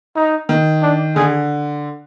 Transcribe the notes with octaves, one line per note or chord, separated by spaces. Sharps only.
D#4
D#3
D4
D3 G#4